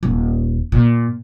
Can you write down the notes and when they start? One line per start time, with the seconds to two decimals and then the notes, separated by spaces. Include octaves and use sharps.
0.03 D#1
0.72 A#2